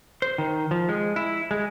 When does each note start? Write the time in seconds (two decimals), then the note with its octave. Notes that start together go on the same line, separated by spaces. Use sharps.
0.22 C5
0.38 D#3
0.71 F3
0.89 G#3
1.16 E4
1.51 G#3